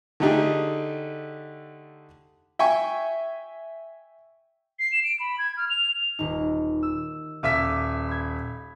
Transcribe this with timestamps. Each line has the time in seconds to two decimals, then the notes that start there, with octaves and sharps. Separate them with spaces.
0.20 D3 A3 D#4 G4 G#4
2.59 E5 G5 G#5 C#6
4.79 C7
4.92 E7
5.04 D7
5.20 B5
5.38 G#6
5.57 F6
5.70 F7
6.19 D#1 D#4
6.83 E6
7.43 D#1 E5 F5 D6 B6 D#7
8.09 B5 G#6